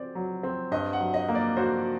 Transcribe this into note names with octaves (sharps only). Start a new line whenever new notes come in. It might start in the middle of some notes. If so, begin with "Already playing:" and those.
Already playing: C4 D5
F#3
C4
G2 D#5
F#5
F#3
D#5
A#3
D5
F#4 C5